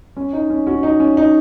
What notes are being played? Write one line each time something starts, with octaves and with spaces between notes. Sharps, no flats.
C#4
D#4
C#4
C#4 F#4
D#4
C#4
D#4